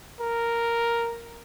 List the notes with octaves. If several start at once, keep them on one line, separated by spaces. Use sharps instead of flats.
A#4